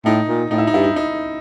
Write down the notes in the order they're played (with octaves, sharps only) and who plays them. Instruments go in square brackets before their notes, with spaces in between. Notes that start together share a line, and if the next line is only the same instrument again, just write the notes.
[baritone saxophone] A2 [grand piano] D#4
[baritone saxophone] A#2
[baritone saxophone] A2 [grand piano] D#4
[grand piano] E4
D#4
[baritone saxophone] G2 [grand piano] E4
[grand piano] D#4
D#4